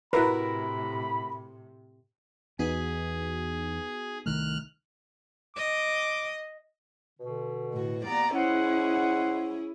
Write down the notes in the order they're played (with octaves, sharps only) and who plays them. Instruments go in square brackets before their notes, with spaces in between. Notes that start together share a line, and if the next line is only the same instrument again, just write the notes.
[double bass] A2 C3 [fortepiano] E4 F#4 A#4 [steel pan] B4 [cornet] B5
[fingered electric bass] E2 [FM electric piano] B3 D#4 F#4 [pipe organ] G#4
[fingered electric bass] C2 D#3 A3 [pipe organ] F6 F#6
[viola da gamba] D#5 [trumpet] D6
[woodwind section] B2 D3
[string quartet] A2 F#4
[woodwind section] G3 A#3 B3 [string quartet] D5 A#5
[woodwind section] G#3 C5 F#5 [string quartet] C#4 E4 G#4